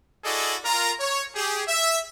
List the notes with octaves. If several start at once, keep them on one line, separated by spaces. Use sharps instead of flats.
E4 F#4 G#4 A4 D5 D#5
F4 A#4 A#5
C#5
G4 G#4
E5